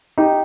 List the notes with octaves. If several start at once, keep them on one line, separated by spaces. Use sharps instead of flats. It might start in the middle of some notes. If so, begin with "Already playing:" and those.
D#4 G4